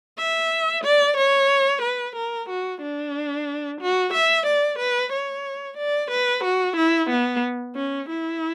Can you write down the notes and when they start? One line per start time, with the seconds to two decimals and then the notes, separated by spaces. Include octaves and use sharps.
0.18 E5
0.84 D5
1.17 C#5
1.82 B4
2.16 A#4
2.49 F#4
2.82 D4
3.81 F#4
4.13 E5
4.46 D5
4.79 B4
5.13 C#5
5.78 D5
6.11 B4
6.44 F#4
6.76 E4
7.10 B3
7.75 C#4
8.09 E4